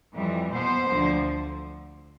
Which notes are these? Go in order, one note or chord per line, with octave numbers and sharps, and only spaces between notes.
F2 E3 G3
B2 B3 C5
D2 D3 F3